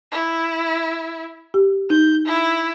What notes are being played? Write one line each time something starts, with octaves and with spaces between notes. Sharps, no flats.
E4
G4
D#4 G6
E4